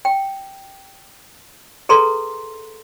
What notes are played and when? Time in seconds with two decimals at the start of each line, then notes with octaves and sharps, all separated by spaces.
0.05 G5
1.89 G#4 A4 B4 A#5 C6